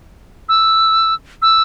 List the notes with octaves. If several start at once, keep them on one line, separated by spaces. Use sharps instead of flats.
E6
E6